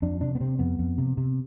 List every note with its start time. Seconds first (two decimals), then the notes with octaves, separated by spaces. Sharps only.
0.02 F2 D4
0.21 C3 D4
0.35 B3
0.40 C3 C4
0.59 F2 B3
0.79 F2
0.98 C3
1.17 C3